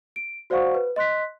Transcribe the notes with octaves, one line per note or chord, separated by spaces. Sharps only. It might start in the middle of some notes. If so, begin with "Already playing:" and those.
D7
F#4 C5 D5 F5 F#5 C#6
B4
D#5 C6 F#6 B6